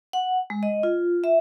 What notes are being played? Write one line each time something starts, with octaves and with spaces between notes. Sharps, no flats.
F#5
G#3
D#5
F4
E5